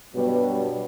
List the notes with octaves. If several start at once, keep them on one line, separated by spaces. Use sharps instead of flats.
G2 B2 F#3 G3 B3